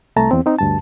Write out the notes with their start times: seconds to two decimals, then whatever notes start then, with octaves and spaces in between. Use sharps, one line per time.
0.16 C2 A3 A5 A#5
0.31 E2 C4
0.46 C4 D#4
0.59 D2 G2 A5